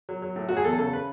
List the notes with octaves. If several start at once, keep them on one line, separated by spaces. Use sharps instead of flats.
F#3
F#3
A2
F#3 F#4
G#4
E2 A4
C#3 A4
B4